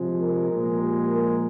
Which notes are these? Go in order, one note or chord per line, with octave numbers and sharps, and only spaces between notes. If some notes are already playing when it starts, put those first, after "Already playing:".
Already playing: C3 F3 G#3
A#4
A#2 F3 G#3
G4
A#4